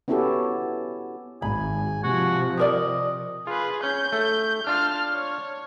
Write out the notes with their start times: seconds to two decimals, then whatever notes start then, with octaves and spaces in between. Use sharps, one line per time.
0.08 B3 C#4 E4 F#4 G4 A4
1.42 G#1 G#5 B5
2.04 C3 F3 F#4
2.58 G4 A#4 D5 D#5
3.47 F4 G#4 B4
3.83 C#4 G6
4.12 A3
4.67 D4 F4 A5 F6
5.14 C#5